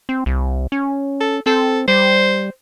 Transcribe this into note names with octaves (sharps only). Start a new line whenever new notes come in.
C4
C2
C#4
A4
C4 A4
G3 C5